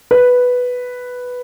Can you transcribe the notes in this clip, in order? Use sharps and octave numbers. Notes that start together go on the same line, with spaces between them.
B4